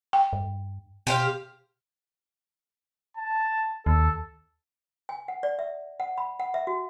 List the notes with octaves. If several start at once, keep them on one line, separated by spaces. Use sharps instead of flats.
G5
G2
B2 G4 C5 F5
A5
D#2 A4
G#5
F#5
D5
E5
F#5
B5
F#5
E5
F#4